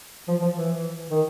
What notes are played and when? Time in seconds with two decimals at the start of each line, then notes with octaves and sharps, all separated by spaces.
0.28 F3
0.42 F3
0.55 E3
1.10 D#3